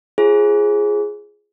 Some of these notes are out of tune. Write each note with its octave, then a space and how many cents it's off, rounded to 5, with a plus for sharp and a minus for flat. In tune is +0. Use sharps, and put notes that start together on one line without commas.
F4 -30 G#4 +0 C5 +35